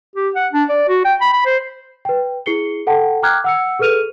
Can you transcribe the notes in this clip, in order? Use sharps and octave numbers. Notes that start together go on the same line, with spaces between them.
G4
F#5
D4
D5
F#4
G5
B5
B5
C5
B4 G5
E4 G#4 C7 C#7 G7
A4 F#5 G5 A5
G5 A#5 D6 F6 F#6 G#6
F#5 E6 C#7
G#4 A4 B4 F6 D#7 F7